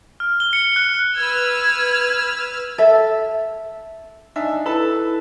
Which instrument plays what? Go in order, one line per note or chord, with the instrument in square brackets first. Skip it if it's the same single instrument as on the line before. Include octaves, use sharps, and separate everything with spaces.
[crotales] F6
G7
C#7
F#6
[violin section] B4 E6 F6 [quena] G#6
[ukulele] A4 E5
[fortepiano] D4 D#4 E5 [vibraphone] G#5
[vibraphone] E4 [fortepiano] A4 B4 A5